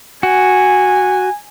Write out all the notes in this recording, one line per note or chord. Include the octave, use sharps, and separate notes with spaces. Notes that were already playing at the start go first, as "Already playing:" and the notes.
F#4 G#5